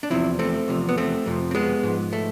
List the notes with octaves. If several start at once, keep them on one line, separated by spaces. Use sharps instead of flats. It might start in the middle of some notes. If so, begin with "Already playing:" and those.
D4
E2 C3 F3 C4 E4
A3 C4
E2 C3 F3
B3
A3 C4
F2 C3 F3
C4
G#3 B3
G#2 F3
A3